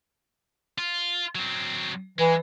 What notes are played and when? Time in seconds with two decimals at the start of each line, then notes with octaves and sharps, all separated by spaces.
0.78 F4
1.35 F#3 C4
2.19 E3 G#3